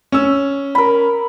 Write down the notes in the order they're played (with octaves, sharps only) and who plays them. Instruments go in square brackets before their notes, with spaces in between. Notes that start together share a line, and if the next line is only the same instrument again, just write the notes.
[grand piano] C#4 E6
[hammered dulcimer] A#4 B5